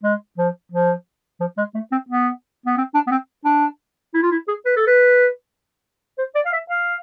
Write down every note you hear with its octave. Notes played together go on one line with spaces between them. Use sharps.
G#3
F3
F3
F3
G#3
A3
C4
B3
B3
C4
D4
B3
C4
D4
E4
F4
E4
G#4
B4
A4
B4
C5
D5
F5
E5
F5